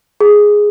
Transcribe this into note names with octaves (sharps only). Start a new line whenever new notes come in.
G#4